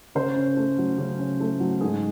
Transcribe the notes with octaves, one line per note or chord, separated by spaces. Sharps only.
C#3 A#4 C5
C#4
A3
F#3
C#3
C#4
A3
F#3
G#2 G#4